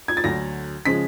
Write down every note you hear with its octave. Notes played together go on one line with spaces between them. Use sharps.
G#6
A6
D2 D3 F#3 A#6
C#3 F3 G#3 B6